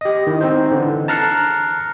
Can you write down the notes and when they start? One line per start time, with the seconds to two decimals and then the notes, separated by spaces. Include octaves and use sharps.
0.01 G4 D#5
0.27 D#3 E4
0.41 C4 D#4 C5
0.72 D3 E3
1.08 A5 A#5 F6 F#6 C7 C#7